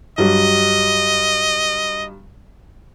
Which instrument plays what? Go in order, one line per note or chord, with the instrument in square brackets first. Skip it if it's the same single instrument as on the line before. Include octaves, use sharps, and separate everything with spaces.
[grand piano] G2 F#3 G3 [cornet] D#5